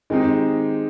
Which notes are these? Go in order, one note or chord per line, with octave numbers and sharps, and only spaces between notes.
D#3 G#3 C4 D#4 G4